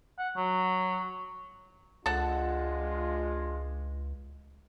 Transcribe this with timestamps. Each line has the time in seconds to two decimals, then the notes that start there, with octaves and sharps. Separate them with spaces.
0.19 F#5
0.37 F#3
2.06 C#2 G#3 D4 F4 A4 F#5